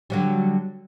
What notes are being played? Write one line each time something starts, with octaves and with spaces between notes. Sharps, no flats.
D3 F#3 G3